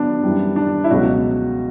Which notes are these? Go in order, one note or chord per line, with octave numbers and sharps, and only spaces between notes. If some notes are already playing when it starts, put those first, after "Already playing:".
Already playing: F#3 B3 D4
F#2 E3 G3
D4
E4
C#2 B2 F#3 F#4